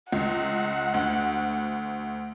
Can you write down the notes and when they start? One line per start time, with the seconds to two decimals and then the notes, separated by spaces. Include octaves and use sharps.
0.13 C#2 F#5
0.94 D2